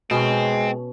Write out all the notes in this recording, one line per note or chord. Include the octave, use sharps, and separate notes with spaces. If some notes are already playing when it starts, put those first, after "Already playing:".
B2 G#3 C4 C#4